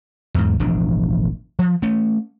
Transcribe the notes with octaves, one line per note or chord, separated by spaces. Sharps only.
E2 G#2
E1 A1 F3 D4
F3
A3 C#4